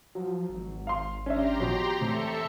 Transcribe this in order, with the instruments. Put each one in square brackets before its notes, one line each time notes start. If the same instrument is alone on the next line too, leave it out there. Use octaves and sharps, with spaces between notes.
[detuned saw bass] F3 [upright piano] F#3
[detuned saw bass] G#1
[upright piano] F5 C6
[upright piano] C#4 D4 E5 [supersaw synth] G4 A#5 C6
[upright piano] B2 F3 C#5
[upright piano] E1 C4 [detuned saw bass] A3 [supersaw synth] A4 E5 C#7